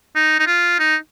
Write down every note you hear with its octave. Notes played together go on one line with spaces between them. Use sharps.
D#4
D#4
F4
D#4